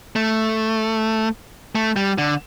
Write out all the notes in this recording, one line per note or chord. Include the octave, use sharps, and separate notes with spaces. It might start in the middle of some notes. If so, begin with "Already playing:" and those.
A3
A3
G3
D3